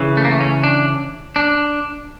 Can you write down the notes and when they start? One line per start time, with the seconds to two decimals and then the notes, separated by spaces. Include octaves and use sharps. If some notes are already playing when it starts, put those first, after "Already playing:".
Already playing: C#3 E3
0.17 A3
0.25 A#3
0.31 A3
0.40 C#4
0.64 D4
1.36 D4